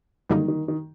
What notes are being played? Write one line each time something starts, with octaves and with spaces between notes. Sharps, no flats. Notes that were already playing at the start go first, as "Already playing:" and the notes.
F#2 D3 D#3 G3 A#3 D#4
D#3
D#3